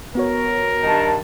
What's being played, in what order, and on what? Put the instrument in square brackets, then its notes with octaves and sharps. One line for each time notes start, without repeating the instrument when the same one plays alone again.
[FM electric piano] B3 F#4 C#5 [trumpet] A#4
[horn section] G2 D#3 A5